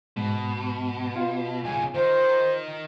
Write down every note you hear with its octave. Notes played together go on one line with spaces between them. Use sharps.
G#2 B2
F4
B1 C#3 G#5
D#3 A#4 C5